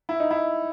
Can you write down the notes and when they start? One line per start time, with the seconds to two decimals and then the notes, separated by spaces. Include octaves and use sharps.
0.09 E4
0.20 D#4
0.31 E4